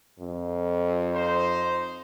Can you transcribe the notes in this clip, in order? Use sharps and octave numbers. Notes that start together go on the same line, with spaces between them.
F2
D#4 C5